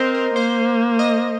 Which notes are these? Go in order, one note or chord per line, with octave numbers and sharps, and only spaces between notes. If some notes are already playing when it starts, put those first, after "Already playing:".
Already playing: C4 A#4 C5 D#5
A#4
A#3 C5
D#5